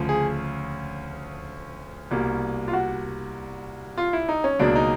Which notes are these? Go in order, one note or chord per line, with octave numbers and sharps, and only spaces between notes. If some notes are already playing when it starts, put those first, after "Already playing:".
Already playing: D2 C#3 F3
G#4
C2 B2 G3 A#3
F4
F#4
F4
E4
D#4
C#4
C#2 B2 F#3 A#3 D4
D#4